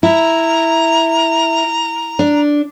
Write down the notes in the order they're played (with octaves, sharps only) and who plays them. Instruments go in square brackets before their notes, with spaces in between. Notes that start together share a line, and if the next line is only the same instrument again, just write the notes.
[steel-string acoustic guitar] E4 [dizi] A#5
[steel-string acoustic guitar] D4